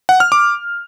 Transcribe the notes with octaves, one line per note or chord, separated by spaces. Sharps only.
F#5
F6
D6